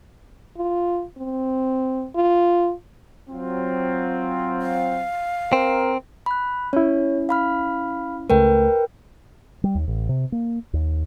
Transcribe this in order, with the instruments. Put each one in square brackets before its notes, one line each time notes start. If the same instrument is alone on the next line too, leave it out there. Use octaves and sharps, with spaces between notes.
[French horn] F4
C4
F4
[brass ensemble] F#3 C4 F4
[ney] F5
[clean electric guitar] C4 [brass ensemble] A#4
[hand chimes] B5 F#6
[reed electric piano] C#4 E4 [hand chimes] C#5
[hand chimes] F5 B5 F6
[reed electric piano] C#2 A3 [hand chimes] A#4 B4 G5
[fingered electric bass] G3
D#2
A1
C3
A#3
D#2